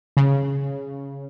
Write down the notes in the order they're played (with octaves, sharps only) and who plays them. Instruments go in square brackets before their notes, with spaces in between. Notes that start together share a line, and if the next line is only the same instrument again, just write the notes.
[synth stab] C#3